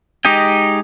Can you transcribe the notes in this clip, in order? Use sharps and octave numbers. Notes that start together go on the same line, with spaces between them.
G#3 D#4 G4 D#5 G5